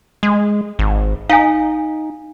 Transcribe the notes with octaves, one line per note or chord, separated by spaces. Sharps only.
G#3
G#1
D#4 F5 G#5